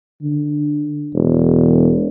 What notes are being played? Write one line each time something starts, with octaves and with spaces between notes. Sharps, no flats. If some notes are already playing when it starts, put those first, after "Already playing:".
D3
E1